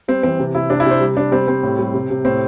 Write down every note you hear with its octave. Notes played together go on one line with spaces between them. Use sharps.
G3 C4
E3 C4
C3
C3 E4
C3 D4
E4
C3 C5
G3
C3 D4
G3 C4
G3 C4
A2
G3
C3
C3
A2 C4